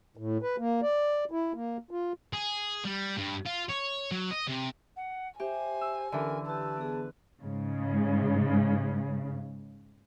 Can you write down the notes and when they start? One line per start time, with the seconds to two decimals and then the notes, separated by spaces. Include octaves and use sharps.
0.17 A2
0.42 B4
0.58 A#3
0.82 D5
1.31 E4
1.54 A#3
1.91 F4
2.33 G#4
2.85 G3
3.17 G2
3.46 F4
3.70 C#5
4.12 F#3
4.31 D#5
4.48 C3
4.96 F#5
5.40 G4 C5 E5 G#5
5.81 E6
6.12 D3 E3 C#4 A4 A#4
6.46 G4 B4 A5 E6
6.77 B3 G#4
7.41 G#2 C#3